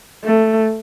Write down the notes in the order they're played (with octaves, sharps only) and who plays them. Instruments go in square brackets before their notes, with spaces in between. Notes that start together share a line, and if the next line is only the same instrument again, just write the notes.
[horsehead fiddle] A3